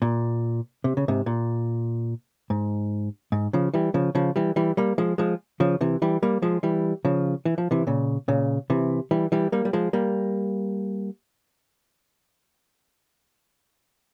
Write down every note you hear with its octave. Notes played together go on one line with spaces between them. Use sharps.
A#2
C3
C#3
G#2 C3
A#2
G#2
G#2
C#3 F3
E3 G3
C#3 F3
C#3 F3
E3 G3
E3 G3
G3 A#3
F3 G#3
F3 G#3
C#3 F3
C3 E3
E3 G3
G3 A#3
F3 G#3
E3 G3
C#3 F3
E3
F3
C3 E3
A#2 C#3
A#2 C#3
C3 E3
E3 G3
E3 G3
G3 A#3
G3
F3 G#3
G3 A#3